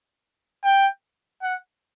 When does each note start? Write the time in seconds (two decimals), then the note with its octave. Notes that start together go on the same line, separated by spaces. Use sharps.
0.64 G5
1.43 F#5